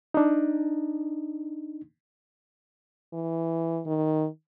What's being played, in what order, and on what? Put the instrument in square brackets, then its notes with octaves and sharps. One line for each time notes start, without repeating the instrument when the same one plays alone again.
[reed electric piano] D4 D#4
[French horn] E3
D#3